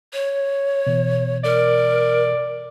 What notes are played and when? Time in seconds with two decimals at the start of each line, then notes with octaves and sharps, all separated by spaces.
0.13 C#5
0.87 B2 E3
1.44 A#4 D5